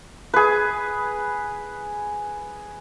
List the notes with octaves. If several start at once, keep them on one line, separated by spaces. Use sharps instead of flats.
G#4 B4